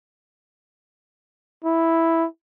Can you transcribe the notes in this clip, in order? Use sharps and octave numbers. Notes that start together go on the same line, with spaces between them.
E4